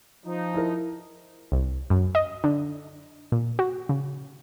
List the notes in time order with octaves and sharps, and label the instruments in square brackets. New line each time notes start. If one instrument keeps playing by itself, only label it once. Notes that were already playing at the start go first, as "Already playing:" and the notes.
[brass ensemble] F3 D#4
[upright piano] E4 A#4
[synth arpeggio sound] C2
F#2
D#5
D3
A#2
F#4
C#3